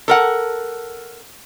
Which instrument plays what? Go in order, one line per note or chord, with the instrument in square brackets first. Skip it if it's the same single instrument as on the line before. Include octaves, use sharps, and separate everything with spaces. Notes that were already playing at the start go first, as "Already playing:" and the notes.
[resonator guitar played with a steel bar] A4 A#4 F#5